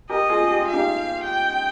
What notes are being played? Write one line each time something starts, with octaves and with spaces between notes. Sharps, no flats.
G4 A#4 D#5
F4 G#4
G4
F4
F5
D#4 G4
G5